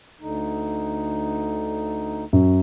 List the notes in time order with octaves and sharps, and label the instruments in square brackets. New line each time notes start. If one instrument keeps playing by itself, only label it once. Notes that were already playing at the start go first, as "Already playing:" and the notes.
[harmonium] D2 D3 D#4
[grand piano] F#2